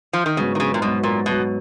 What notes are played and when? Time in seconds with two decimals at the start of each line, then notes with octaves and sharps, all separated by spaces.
0.13 F3
0.26 D#3
0.37 G#2 C#3 F#3 B3
0.55 D#3
0.60 C#3
0.74 A#2
0.81 G#2 B2 F#3 B3
1.03 A#2
1.26 G#2 B2 F#3 B3